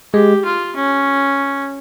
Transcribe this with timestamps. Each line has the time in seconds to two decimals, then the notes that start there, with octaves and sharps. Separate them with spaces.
0.13 G#3 G4
0.45 F4
0.76 C#4